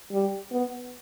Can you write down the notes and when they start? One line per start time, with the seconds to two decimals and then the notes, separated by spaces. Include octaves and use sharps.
0.12 G3
0.52 B3